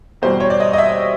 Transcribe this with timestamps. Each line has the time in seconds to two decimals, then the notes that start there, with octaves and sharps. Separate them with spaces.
0.22 E2 B2 G3 C5
0.40 C#5
0.50 D5
0.60 D#5
0.73 D#5
0.78 E5